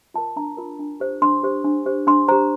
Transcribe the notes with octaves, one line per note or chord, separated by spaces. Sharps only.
F4 A#4 A5
D4 A#5
F4 A#4
D4
G4 C5
D4 C6
G4 C5
D4
G4 C5
D4 C6
G4 C5 A#5